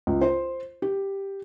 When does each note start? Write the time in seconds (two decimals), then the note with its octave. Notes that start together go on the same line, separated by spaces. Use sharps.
0.07 C#2
0.22 C5
0.82 G4